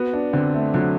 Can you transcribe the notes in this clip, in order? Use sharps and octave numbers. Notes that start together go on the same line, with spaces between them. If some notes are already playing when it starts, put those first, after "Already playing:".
Already playing: B3 F#4
D4
D3 C4
A3
D3 F#3